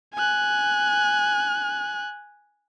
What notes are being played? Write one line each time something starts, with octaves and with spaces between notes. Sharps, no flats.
G#5 F#6